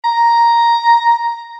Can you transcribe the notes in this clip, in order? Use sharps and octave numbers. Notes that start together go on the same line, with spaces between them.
A#5